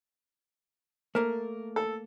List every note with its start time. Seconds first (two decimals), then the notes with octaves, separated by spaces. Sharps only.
1.15 A3 A#3 A#4
1.76 A4